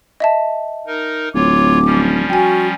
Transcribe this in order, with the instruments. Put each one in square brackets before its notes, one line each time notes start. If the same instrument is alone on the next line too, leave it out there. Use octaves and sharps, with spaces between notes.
[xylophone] D#5 E5 A5
[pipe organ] D#4 A#4
[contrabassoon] D1 [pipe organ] F4 C#5 [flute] D6
[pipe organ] F3 G3 C#4
[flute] F#4 [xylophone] G5 G#5